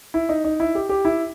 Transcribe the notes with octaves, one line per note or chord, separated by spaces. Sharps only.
E4
D#4
D#4
E4
G4
G4
E4